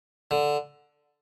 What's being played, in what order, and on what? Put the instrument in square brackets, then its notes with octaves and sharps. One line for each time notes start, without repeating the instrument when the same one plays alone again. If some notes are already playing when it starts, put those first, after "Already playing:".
[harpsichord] D3